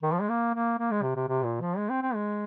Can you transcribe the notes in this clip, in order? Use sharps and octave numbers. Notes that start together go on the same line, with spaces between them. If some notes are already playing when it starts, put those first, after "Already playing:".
D#3
F3
G#3
A#3
A#3
A#3
G#3
C3
C3
C3
A#2
F3
G#3
C4
C4
G#3